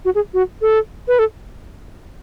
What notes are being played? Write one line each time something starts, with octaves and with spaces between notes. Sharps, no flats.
F#4
G#4
F#4
A4
B4
A4